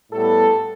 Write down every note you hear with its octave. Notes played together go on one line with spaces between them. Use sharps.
A2 G3 B3 A4